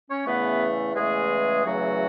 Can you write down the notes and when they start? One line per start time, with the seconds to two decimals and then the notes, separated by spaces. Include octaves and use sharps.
0.09 C#4 C#5
0.26 E2 C#3 E3 A3 B3 B4
0.95 E2 C#3 E3 G#3 A3 G#4
1.65 E2 C#3 E3 F#3 A3 F#4